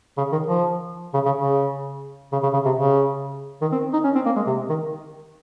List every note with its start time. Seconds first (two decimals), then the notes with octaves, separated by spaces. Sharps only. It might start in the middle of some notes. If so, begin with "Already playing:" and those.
0.17 C#3
0.32 D#3
0.47 F3
1.14 C#3
1.25 C#3
1.36 C#3
2.32 C#3
2.43 C#3
2.53 C#3
2.65 C3
2.76 C#3
3.62 D#3
3.72 C4
3.93 D#4
4.04 C#4
4.15 C4
4.26 A#3
4.36 G#3
4.47 C3
4.69 D#3